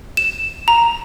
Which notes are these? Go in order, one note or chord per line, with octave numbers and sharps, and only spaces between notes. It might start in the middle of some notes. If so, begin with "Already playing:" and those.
E7
A#5